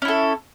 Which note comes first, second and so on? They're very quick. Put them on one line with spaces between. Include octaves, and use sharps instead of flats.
C#4 E4 A4